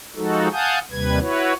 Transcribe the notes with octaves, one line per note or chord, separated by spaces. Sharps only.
F3 G#3 D#4 F#4 A4
F5 F#5 G#5 A5 D#6 G6
D#2 C3 G3 B4 G#6
E4 F#4 B4 C#5